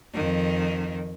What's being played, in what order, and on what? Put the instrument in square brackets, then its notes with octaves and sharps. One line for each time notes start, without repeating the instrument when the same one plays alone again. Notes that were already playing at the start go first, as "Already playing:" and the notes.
[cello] F2 D#3